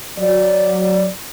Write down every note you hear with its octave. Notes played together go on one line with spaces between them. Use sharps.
F#3 D5